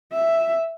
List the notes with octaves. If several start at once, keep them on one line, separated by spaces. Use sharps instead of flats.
E5